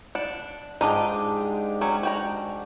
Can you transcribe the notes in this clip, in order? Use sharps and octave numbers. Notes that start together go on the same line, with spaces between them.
D4 F#5
G#2 D4 D#4 F4 G4 D#5
F#3 C#4
F#4 G5 A#5